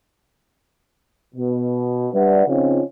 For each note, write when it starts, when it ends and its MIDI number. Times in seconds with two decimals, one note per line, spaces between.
1.35 2.09 47
2.14 2.43 55
2.14 2.43 62
2.14 2.43 71
2.14 2.43 74
2.14 2.43 76
2.14 2.43 78
2.47 2.80 49
2.47 2.80 53
2.47 2.80 60
2.47 2.80 61
2.47 2.80 63
2.47 2.80 65